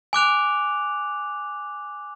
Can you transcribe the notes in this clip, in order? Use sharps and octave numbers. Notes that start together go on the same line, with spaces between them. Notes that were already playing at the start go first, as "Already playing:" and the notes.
G#5 D6 F#6 F7